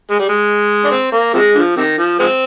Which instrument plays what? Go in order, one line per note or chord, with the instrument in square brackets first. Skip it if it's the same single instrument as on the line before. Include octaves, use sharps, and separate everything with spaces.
[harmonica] G#3
G3
G#3
D4
C4
A#3
C3 F3 G#3
D3 F3
C3 D#3
F3
F3 G#3 C4